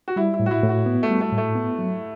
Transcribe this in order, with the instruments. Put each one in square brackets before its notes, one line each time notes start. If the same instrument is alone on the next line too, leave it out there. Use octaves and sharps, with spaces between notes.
[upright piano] F#4
[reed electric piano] G3 [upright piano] E4
[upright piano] E4
[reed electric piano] A2
[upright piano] F#4
E4
[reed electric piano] A2
[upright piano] F#4
[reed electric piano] B3
[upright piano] A3
[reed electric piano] G3
[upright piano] A3
[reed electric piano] A2
[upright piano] A3
[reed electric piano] B3
F#3